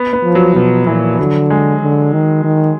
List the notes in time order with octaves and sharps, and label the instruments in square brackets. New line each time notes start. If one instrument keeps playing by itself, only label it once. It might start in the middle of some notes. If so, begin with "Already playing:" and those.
Already playing: [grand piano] B3
B3
[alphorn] F3
[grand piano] F#3
[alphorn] B2 [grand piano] F3
[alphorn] A#2 [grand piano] E3
[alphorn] D3 [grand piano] F#3
[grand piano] G#3
[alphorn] D3
D#3
D#3